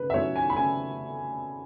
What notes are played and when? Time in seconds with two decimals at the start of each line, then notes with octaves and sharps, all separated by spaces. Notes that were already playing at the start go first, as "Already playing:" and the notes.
Already playing: C#3 B4
0.10 E5
0.14 F#3 C#4 E4 C#5
0.36 G#5
0.50 B5
0.57 C#3 G#5